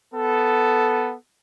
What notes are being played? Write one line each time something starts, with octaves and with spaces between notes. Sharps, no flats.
B3 A4